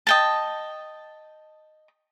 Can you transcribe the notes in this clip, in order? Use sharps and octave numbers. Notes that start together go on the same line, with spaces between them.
D#5 G5 A5